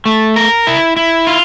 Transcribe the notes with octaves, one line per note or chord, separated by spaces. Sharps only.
A3
A#4
E4
E4
F4